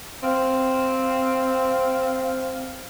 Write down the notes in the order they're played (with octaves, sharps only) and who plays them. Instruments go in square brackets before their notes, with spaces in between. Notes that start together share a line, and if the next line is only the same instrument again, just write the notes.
[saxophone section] C4 F5